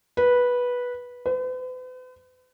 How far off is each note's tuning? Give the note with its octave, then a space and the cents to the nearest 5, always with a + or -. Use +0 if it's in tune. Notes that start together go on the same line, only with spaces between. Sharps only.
B4 -10
B4 +45